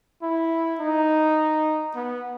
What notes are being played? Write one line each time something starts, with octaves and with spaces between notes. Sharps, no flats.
E4
D#4
B3